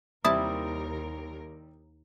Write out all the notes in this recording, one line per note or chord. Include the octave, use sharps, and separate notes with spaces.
D#2 C3 G3 C4 E4 A#4 A5 D#6